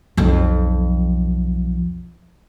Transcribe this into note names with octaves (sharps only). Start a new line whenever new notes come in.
B1 F2